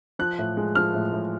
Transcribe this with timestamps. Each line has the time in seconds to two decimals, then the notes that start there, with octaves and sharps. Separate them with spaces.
0.19 F3 F#6
0.38 A2
0.57 G#3
0.75 F3 F6
0.94 A2
1.13 A2